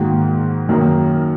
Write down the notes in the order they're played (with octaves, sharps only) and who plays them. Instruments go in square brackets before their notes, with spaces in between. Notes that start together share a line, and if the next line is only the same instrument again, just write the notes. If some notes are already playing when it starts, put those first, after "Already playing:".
Already playing: [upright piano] G#2 D#3 A#3 F#4
F#2 D#3 A#3 D#4 A#4